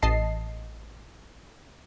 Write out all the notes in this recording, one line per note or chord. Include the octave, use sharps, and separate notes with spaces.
A1 D#5 A5 C7